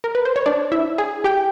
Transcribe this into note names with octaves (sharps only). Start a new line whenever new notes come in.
A#4
B4
C5
C#5
D4 D5
E4 E5
G#4 G#5
G4 G5